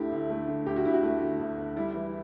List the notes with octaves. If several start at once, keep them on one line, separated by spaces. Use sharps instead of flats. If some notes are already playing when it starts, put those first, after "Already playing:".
Already playing: D2 D3 A3 E4 G4
D2
A3
D3
D2 G4
F#4
D2 E4
F#4
A3
D3
D2
D2
G3 E4
E3